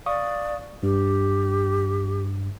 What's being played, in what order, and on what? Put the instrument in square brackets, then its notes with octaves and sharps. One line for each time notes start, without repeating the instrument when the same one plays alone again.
[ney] D5 [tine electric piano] F5 C#6 D#6
[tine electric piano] G2 [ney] G4